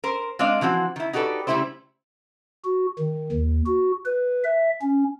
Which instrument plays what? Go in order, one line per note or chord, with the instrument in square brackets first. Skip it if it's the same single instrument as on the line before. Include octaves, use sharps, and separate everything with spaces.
[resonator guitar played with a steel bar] A#4 C5
G#3 C4 D4 D5 D#5 F5
E3 F3 C4 F#4
D#3 E4
D#4 F#4 G4 A4 B4 D5
C#3 G3 A3 E4 G4 C5
[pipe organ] F#4
D#3
D#2
F#4
B4
E5
C#4